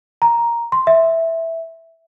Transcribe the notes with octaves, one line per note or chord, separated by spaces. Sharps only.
A#5
C6
E5